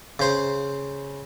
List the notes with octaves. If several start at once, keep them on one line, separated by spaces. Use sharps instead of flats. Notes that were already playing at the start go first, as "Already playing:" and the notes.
C#3 C5